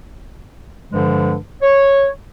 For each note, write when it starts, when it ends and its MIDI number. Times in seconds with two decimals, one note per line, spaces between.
0.92 1.36 43
0.92 1.36 50
0.92 1.36 53
0.92 1.36 56
1.62 2.08 73